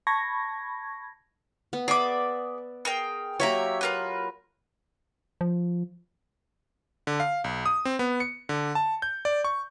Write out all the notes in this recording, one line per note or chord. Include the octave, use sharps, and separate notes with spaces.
A5 B5 C#6 G#6 A#6
B3
G#4 D5 E5 B5 D6
G#4 A#4 G5
F#3 A#3 G4 C#5 E5 A#5
F4 A#4 B4
F3
D3
F5
B1
D#6
C4
B3
C#7
D3
A5
G6
D5
C#6